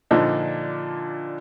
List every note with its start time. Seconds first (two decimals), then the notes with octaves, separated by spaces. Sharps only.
0.11 A#2 D3 F3 D4 D#4